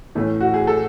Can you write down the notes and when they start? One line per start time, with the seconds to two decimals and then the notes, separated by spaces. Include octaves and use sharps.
0.15 A2 E3 A3 C#4
0.41 F#4
0.54 G#4
0.67 A4